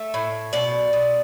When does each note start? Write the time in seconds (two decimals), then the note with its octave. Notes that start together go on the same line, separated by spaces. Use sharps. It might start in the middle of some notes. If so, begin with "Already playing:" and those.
Already playing: A3 E5
0.14 A2
0.53 B2 D5
0.93 B2